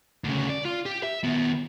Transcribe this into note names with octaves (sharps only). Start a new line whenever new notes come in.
D2 C#3
D5
F4
G4
E5
D#3 B3